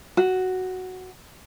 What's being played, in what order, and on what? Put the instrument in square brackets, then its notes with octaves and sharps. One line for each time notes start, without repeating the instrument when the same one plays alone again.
[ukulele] F#4